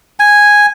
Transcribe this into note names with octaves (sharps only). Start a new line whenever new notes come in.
G#5